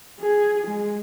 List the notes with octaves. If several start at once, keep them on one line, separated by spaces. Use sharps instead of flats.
G#4
G#3